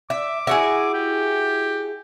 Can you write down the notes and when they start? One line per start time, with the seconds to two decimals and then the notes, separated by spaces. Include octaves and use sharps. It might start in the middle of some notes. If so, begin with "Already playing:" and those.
0.10 E5 D6
0.47 E4 F#4 G#4
0.94 G4